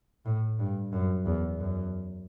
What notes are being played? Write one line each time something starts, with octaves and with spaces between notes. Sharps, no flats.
A2
G2
F#2
E2
F#2